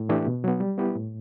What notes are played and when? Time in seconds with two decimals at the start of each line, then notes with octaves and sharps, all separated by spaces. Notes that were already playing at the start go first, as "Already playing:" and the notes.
Already playing: A2
0.09 E3 A3 D4 G4
0.27 B2
0.44 F#3 B3
0.60 G3
0.78 B3 E4 G4 B4
0.95 A2